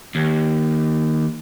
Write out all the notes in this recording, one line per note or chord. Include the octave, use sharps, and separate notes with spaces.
D#2